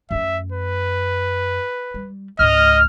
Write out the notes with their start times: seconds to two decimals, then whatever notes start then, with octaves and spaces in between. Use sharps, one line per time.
0.11 F#2 A3 E5
0.52 B4
1.94 G3
2.39 C#2 G#2 D#5 F6